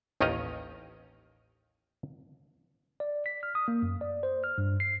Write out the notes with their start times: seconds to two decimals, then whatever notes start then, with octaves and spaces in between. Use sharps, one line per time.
0.21 A1 D#2 D#3 C#4 D#5 A#5
3.00 D5
3.26 B6
3.43 F6
3.55 D#6
3.68 A#3
3.82 F#2
4.01 D5
4.23 C5
4.44 F6
4.58 G2
4.80 C7